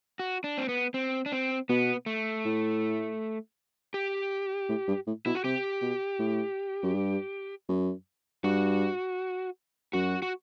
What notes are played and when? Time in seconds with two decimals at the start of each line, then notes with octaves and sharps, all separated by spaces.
0.19 F#4
0.44 D4
0.58 C4
0.69 B3
0.94 C4
1.26 D4
1.32 C4
1.69 B2 B3
2.06 A3
2.45 A2
3.94 G4
4.69 A2
4.88 G2
5.07 A2
5.26 B2 E4
5.35 F#4
5.44 C3 G4
5.82 B2
6.19 A2
6.83 F#2
6.94 G2
7.68 F#2
8.43 G2 F#4
9.93 F#2 F#4
10.22 F#4